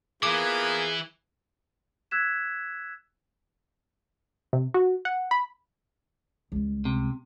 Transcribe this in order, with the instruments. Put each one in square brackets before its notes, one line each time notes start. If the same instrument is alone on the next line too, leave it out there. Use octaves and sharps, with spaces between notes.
[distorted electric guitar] E3 [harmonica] A#3 B3 F4 [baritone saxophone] G#4 [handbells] D6
[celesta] E6 F#6 G#6 B6 E7
[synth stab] C3
F#4
F#5
B5
[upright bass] C#2 G3
[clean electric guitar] C3